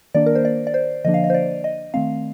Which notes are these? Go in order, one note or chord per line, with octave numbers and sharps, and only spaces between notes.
D#3 A#3 D4 D5
A#4
C5
D5
D5
C5
D3 F3 A#3 D4 D#5
F5
D#5
C5
D5
D#5
D#3 A3 C4 F5